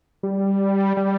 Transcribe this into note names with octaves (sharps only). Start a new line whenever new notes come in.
G3
G3